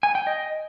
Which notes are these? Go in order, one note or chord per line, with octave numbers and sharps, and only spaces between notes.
G#5
G5
D#5